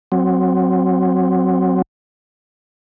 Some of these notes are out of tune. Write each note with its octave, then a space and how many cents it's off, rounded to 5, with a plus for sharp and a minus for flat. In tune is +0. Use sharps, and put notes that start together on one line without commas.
F#3 -5 C4 +10